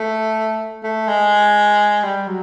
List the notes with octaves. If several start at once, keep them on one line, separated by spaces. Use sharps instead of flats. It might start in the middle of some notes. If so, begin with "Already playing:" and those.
Already playing: A3
A3
G#3
G3
F#3